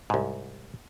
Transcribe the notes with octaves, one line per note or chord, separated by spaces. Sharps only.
C2 G#2